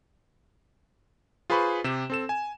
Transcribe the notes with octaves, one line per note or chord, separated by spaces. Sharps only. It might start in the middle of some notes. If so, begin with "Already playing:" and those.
F4 G#4 B4 C5 B5 C#6
C3 G4 E7
C4 A4 E7
G#5